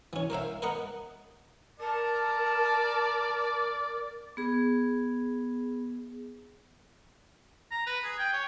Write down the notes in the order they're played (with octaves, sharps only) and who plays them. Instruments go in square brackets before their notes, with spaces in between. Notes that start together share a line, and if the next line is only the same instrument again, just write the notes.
[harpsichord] E3 C#4
A#4 C5 E5 F5
A#4 B4 D#5 F#5 A#5
[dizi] A#4 [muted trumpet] D5 [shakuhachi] A5
[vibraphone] B3 G#4
[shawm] A#5
B4
G#4
G5
C#5